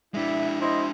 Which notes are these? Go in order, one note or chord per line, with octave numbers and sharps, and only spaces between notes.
G#3 D4 E4 E5
E4 C5 D#5